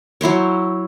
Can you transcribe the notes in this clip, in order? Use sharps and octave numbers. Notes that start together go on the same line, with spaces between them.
F#3 E4 C5 C#5